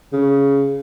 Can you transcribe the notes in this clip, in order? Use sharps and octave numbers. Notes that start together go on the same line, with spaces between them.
C#3